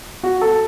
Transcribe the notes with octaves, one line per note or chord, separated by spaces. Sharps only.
F#4
A4